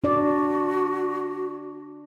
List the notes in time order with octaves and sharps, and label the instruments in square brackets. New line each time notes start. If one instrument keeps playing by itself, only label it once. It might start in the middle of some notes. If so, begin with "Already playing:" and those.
[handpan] D4 D5 [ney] F#4